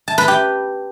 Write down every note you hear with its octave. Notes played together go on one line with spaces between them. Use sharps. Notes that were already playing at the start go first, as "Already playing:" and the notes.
A5
B4
G4